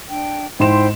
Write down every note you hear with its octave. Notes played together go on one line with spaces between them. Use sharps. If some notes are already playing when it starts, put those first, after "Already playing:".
D4 G5
G#2 E4 C5 G5 C6 E7